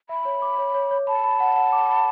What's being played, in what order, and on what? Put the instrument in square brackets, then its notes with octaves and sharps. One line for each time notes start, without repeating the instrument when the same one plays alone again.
[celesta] E5 [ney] B5
[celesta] C#5
D6
C#5
C#5
C#5
[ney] A5 [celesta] B5
[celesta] B5
F#5
F#5
D6
B5